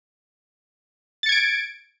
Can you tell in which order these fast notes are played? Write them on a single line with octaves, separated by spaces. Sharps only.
A6 C#7 G#6 D7